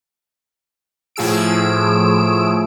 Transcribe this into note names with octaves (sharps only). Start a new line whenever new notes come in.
A2 F3 G#4 E6 D7